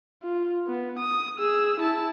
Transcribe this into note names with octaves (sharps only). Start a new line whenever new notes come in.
F4
B3
D#6
G#4 E6
E4 A5